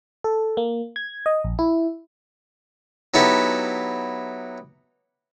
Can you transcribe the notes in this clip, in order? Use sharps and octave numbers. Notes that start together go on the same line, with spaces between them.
A4
A#3
G#6
D#5
A#1
E4
F#3 B3 D#4 E4 G4 A4